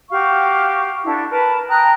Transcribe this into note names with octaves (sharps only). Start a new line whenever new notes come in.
F#4 G4 F5 C#6
D4 E4 F#4 A4
A#4 B4 A5 B5
G5 A#5 D#6 F#6